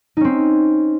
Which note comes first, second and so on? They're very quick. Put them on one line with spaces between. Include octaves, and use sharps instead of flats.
D#4 C#4 C4